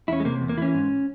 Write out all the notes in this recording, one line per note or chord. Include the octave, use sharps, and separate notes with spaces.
E2 C#4 E4
G#3
C3 A#3
E2
A#3
E3 C#4 E4
G#2